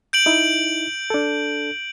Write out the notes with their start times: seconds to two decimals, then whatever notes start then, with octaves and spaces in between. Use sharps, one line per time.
0.13 G6 D7 F#7
0.26 D#4 E4
1.10 D4 A4